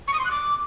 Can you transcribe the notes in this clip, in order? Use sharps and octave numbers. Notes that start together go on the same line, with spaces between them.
C#6
D#6
C6
F#6
D6